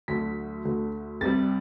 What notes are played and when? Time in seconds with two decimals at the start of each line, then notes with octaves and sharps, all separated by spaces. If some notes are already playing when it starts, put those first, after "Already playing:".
0.08 D2 D3 F#3 A3 B6
0.65 D2 D3 A3
1.21 C2 C3 G3 A6